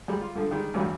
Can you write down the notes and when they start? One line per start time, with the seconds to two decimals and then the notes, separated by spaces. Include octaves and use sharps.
0.08 F#2 G3 G#3
0.21 F4
0.35 G2 D3 F3
0.51 D#3 G3 G#3
0.74 A1 E2 G2 F#3 G3